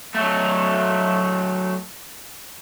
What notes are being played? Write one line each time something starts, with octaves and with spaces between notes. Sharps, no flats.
F#3 A3